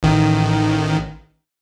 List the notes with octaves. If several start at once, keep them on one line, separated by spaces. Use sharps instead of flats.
A1 D#3